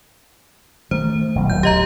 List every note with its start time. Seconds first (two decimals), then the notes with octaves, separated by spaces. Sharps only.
0.91 D#3 A3 C5
1.35 D#1 B1
1.50 D1 A2 F#3 G6
1.63 G4 D#5 A#5